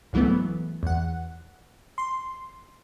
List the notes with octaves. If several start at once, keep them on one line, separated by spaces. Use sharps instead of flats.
C#2 G#2 E3 F#3 A3 B3
E2 F#5
C6